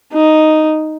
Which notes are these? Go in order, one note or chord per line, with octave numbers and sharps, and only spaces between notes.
D#4